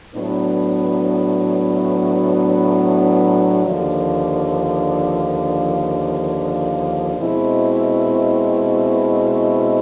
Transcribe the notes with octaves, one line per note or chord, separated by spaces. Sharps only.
A2 F#3 B3 D4
D#2 D3 F3
B2 G#3 C4 E4